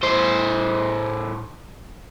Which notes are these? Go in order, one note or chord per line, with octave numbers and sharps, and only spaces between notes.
A2 C5